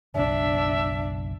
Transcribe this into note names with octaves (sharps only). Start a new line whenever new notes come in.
F#1 B1 D4 E5